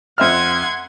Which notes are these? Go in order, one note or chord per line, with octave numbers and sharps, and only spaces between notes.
F2 E5 F#5 C6 F6 G#6